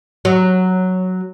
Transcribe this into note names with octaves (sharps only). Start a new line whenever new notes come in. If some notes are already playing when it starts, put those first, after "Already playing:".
F#3